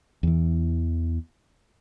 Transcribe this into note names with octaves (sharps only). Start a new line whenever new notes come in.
E2 E3